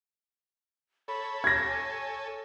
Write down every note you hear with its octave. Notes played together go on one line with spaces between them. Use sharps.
A4 C#5 B5
G4 G#6 A#6
G#5